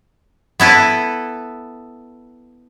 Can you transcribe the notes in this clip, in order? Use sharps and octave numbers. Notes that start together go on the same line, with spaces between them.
B3 E4 A4 B4